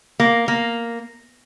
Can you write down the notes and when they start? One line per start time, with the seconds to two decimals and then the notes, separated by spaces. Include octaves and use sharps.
0.20 A#3
0.48 A#3